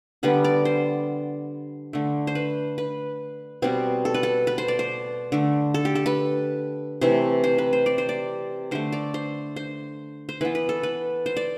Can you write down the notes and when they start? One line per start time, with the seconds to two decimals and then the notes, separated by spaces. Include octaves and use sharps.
0.23 D3 G3 B3 B4
0.44 D5
0.65 C5
1.93 D3 A3
2.27 C5
2.35 B4
2.78 B4
3.62 B2 G3 B3 C4
4.05 A4
4.14 B4
4.23 A4
4.47 B4
4.58 C5
4.68 D5
4.79 C5
5.32 D3 A3
5.74 A4
5.85 G4
5.95 A4
6.06 B4
7.01 C3 E3 A3 C5
7.44 C5
7.58 B4
7.73 C5
7.86 D5
7.98 C5
8.09 D5
8.71 D3 A3 C5
8.92 D5
9.14 C5
9.56 C5
10.29 C5
10.41 E3 B3 B4
10.55 B4
10.69 A4
10.83 B4
11.26 C5
11.37 D5